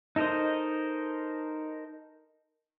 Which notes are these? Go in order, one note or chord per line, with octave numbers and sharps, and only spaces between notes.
D#4 A4 A#4 C5 D#5